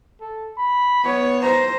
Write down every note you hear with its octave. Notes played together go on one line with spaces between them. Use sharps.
A4
B5
B3 C#5
C5 A#5